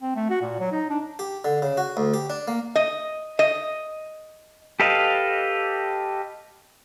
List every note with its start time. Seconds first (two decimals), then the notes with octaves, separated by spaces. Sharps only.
0.01 C4
0.16 A3
0.30 F#4
0.42 A#2
0.59 F#3
0.72 D#4
0.90 D4
1.19 G4
1.45 D3
1.62 C#3
1.77 F#4
1.97 D2
2.14 G4
2.30 D4
2.48 A#3
2.76 D#5
3.39 D#5
4.80 G4 A4 B4 D#5 F5